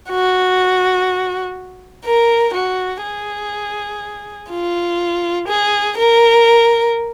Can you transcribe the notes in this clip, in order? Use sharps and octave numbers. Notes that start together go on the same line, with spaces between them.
F#4
A#4
F#4
G#4
F4
G#4
A#4